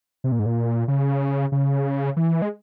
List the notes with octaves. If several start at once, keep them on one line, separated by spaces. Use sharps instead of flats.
C3
A#2
G#2
A#2
C#3
C#3
E3
G#3